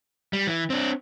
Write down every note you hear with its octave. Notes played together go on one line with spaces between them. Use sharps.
G3
E3
C4 D4